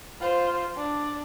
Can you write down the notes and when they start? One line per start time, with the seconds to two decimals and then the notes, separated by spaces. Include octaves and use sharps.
0.21 F4 C5
0.76 D4